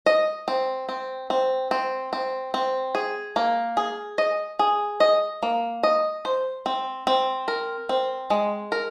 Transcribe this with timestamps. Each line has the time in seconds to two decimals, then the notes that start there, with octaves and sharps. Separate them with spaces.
0.06 D#5
0.48 C4
0.89 C4
1.30 C4
1.71 C4
2.13 C4
2.54 C4
2.95 G#4
3.36 A#3
3.77 G#4
4.18 D#5
4.59 G#4
5.00 D#5
5.43 A#3
5.83 D#5
6.25 C5
6.66 C4
7.07 C4
7.48 A#4
7.89 C4
8.30 G#3
8.72 A#4